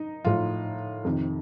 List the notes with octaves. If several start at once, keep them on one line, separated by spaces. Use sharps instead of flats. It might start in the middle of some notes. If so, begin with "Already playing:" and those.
Already playing: D#4
A2 F3 F4
F2 C3 D#3